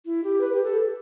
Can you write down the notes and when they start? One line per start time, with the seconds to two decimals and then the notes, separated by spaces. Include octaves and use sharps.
0.05 E4
0.23 G4
0.40 B4
0.52 G4
0.64 A4